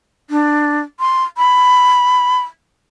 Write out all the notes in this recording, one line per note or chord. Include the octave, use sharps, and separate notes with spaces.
D4
C6
B5